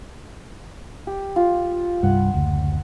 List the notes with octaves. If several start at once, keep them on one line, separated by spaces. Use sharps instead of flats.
G4
F4
C2 G2 F#5
F#1 D2